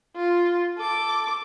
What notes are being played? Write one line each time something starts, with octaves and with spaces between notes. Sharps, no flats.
F4
A4 D6